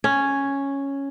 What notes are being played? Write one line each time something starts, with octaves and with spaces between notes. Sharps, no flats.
C#4